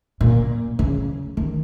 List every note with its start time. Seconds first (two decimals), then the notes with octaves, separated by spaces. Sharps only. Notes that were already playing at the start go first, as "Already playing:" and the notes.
0.21 A#2
0.79 C#3
1.37 D#3